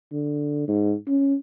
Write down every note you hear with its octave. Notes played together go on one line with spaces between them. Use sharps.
D3
G#2
C#4